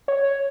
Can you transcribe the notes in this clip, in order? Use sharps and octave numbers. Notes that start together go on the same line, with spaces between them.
C#5